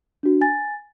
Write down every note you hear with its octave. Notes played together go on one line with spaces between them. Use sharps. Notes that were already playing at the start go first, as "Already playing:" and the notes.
D4 F#4
G#5 A6